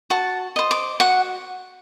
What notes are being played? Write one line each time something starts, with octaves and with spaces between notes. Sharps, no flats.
F#4 A5
C5 D#5
D6
F#4 F#5